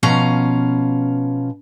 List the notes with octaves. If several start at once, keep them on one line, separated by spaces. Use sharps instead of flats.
B2 F3 C#4 F5 A#5